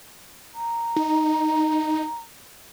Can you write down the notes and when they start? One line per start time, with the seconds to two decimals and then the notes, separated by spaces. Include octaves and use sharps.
0.54 A#5
0.96 D#4